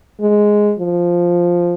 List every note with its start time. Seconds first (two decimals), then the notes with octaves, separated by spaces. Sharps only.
0.20 G#3
0.79 F3